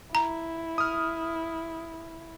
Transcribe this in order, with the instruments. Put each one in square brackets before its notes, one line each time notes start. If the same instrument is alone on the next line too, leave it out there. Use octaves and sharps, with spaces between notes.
[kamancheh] E4 [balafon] A#5
[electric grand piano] D#6 F6